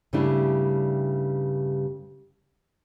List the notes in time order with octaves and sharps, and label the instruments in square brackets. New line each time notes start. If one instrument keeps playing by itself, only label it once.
[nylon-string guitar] G2 C#3 G3 A3 D4 E4